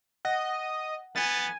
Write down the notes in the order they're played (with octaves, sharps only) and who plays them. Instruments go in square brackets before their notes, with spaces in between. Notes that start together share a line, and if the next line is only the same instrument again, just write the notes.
[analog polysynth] D#5 [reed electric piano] F#5
[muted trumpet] B3 [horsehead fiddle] G#5 [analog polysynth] A6